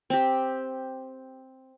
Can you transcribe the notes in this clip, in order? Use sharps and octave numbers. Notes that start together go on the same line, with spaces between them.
C4 G4